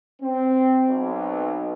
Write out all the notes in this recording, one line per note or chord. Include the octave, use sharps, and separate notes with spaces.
C4
B1